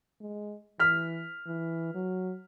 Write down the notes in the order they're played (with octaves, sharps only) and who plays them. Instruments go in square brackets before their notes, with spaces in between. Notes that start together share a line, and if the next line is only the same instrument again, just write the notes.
[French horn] G#3
[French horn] E3 [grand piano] F6 B6
[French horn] E3
F#3